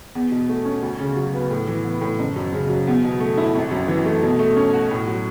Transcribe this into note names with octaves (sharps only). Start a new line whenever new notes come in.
E2
B2
A3
C#4
D2
C#3
F#3
B3
A2
E3
B3
A2
F#1
F#2
C#3
F#3
E2
B2
A3
E4
G#1
F#2
E3
A3
B2
A3
C#4
F#4
A2
F#3